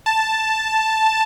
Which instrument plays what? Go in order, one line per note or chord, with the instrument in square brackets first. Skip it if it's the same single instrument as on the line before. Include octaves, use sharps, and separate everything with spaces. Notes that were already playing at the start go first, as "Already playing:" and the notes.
[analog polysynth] A5